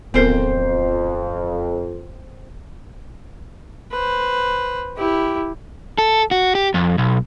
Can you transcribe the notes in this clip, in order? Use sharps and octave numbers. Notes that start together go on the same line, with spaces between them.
D1 F2 B3 C4 A4 A#4 C5
B4 C5
E4 G4
A4
F#4
G4
F2
B1